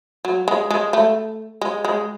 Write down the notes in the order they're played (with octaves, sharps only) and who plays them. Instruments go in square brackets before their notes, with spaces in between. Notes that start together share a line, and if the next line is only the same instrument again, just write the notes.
[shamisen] F#3
G#3
G#3
A3
G#3
G#3